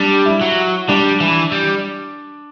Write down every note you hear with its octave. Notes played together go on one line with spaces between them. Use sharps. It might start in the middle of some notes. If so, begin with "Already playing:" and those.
Already playing: G3 D4
E4
F#3
G3 D4
E3
G3